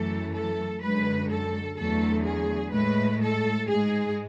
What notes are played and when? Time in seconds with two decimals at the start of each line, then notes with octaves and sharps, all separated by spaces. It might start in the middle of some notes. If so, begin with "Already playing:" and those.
Already playing: F#2 E3 A3 A4
0.32 A4
0.81 F#2 D3 G#3 B4
1.29 A4
1.76 E2 D3 F#3 A3 A4
2.25 G#4
2.72 A2 G#3 B4
3.21 A4
3.68 G#2 G#3 G#4